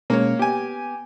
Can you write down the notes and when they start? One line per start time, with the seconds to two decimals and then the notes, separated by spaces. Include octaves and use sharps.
0.10 B2 G#3 A#3 C#4 C#5
0.39 B3 G4 G#5